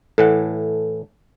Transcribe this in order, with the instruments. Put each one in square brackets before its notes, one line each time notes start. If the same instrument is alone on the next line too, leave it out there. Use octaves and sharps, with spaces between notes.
[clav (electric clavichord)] A2 E3 F#5 [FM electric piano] A4